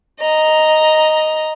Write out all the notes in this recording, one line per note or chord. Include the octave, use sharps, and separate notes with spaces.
D#5 A#5